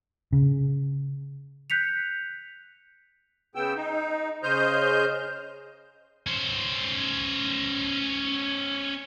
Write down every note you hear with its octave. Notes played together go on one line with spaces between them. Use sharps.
C#3
F#6 G6 B6 C#7 F7
C#3 B3 G5 E6
D#4
C#3 C5 D#5 F6 G6
C#4 C5